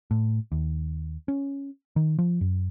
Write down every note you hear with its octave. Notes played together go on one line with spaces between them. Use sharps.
A2
D#2
C#4
D#3
F3
F#2